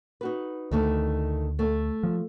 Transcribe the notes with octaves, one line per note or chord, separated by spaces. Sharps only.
D#4 F#4 B4
D2 D#3 A3 D#4
A3
F3